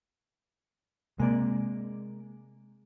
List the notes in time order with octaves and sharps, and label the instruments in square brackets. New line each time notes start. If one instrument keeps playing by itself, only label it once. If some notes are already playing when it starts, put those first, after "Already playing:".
[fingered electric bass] C3 [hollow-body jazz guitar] G#3 A#3 D5